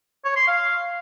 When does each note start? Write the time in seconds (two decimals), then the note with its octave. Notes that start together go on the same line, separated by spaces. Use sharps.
0.25 C#5
0.36 C6
0.47 F5